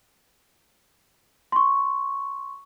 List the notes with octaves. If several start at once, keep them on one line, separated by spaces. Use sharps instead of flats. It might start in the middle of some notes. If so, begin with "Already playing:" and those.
C6 C#6